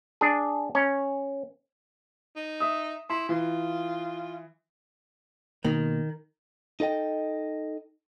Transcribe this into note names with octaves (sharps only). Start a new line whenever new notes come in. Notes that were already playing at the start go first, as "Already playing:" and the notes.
D4 G#4
C#4
D#4
E5 D#6
E4 C6
E3 F4
B2 D#3 A#3
D#4 A4 D#5 G5